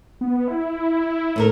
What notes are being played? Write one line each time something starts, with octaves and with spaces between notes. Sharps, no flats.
B3
E4
A2 A3 A#4